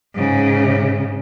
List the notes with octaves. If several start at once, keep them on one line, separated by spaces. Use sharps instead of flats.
G#2 C#3